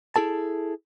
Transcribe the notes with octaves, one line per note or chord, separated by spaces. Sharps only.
E4 G#4 A4 A5